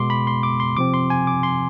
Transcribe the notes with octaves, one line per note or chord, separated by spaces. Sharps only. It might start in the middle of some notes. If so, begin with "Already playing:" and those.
Already playing: B2 G#3 B3 C6 D6
B5
C6
D6
C6
C3 F3 C4 D6
C6
G#5
D6
C6